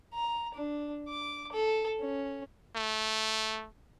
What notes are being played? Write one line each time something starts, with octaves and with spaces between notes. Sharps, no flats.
A#5
D4
D6
A4
C#4
A3